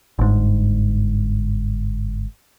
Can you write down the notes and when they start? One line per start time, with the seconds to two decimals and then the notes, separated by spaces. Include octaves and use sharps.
0.19 G1 G#2